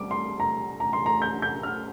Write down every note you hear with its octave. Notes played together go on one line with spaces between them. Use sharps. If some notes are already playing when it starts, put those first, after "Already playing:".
Already playing: C3 G3 D6
C6
A#5
A#5
C6
A#5
G6
G6
F6